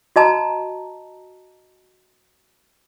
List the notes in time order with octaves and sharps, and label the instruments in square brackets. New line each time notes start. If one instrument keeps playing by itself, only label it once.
[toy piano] F#4 D#5 A5 A#5